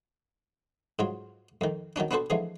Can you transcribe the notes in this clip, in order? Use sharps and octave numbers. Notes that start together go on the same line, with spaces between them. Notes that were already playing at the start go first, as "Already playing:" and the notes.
G#2 F#3 F4
F2 D#3
D#3 F#3 C#4 D4
B3 C4 D4 F#4 A4 C5
D3 E3 F3 G#3 A3